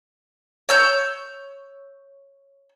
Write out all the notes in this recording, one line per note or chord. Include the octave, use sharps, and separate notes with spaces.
C#5 E6 G6